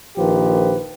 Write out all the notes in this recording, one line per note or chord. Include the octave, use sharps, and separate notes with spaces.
A#1 D#3 F3 G4 B4